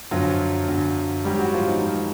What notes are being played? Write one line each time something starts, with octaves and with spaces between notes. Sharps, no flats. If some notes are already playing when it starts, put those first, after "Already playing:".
F#2 D3 F3 F#3 F4
F#2 D3 F#3
G#2 D#3 F#3 G3 G4
F#3 F#4
F3 F4
D#3 D#4
G#2 D#3 F#3